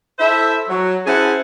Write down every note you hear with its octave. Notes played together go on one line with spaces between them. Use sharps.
E4 A4 C5 E5
F#3
C#4 E4 G#4 C5 F#5 A5